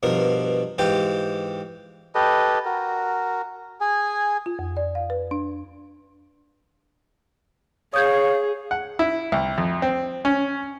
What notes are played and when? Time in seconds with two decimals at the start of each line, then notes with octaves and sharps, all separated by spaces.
0.03 G2 B2 F3 A#4
0.78 G#2 E3 F4 G4 G5
2.15 G4 A4 B4 D#5
2.65 F#4 A#4
3.81 G#4 G#5
4.46 F4
4.59 F2
4.77 D5
4.95 F5
5.10 B4
5.31 D4
7.94 G#4 C#5 F5 D#6 G6 G#6
8.71 F#5
8.99 E4
9.32 C2
9.58 F2
9.82 C4
10.25 C#4